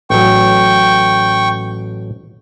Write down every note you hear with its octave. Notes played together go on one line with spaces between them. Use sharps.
A1 F#3 G5 C#6